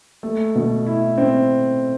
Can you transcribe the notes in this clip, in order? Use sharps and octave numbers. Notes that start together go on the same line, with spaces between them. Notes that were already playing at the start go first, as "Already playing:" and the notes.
A3
B2
E4
C4